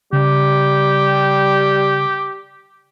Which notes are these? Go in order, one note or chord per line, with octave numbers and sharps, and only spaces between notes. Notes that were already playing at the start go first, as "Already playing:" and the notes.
C#3 G3 G4